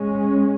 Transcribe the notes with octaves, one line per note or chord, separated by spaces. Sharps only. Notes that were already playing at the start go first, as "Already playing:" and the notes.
Already playing: G#3 C#4